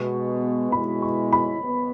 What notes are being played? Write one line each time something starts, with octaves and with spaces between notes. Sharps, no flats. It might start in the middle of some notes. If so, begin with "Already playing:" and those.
Already playing: B2 G#3 B3 C#6
B2 G#3 E4 B5
C#6
B5
B3